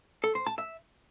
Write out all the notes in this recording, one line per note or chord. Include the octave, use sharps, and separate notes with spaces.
A4
C5
A5
E5